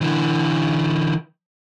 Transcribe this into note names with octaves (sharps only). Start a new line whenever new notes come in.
D3 E3